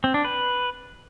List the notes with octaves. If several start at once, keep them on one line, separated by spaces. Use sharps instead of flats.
C4
D4
B4